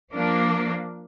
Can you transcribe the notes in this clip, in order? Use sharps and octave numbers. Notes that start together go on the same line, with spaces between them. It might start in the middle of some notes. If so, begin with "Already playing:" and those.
F3 A#3 D4